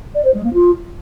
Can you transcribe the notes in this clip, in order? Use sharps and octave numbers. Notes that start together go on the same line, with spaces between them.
D5
C5
G#3
A#3
F4